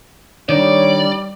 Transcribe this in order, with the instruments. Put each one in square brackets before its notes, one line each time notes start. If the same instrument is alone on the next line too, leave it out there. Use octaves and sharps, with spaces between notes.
[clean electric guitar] D#3 D4 D#4 [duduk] G3 [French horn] C#5 [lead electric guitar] D5